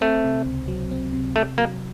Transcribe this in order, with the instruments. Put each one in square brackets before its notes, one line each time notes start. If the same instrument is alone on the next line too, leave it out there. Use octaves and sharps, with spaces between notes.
[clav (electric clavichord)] A3 [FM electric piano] C4
[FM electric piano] C3
C#2
F#3
C4
C3
[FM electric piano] C3 [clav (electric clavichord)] A3
[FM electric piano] F#3 [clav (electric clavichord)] A#3